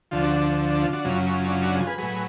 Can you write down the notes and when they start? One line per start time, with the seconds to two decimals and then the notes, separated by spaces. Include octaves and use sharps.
0.11 D2 D3 F3 F4
0.23 D4 F#4
0.36 D4
0.70 D4
0.82 F4
0.93 D4 F#4
1.04 F#2 C#3 F#3 F4
1.29 F4
1.39 F4
1.48 D4
1.51 F4
1.63 D4 F#4
1.75 F4 G#4
1.87 G#4 B4
1.98 A2 F#3 G#4 B4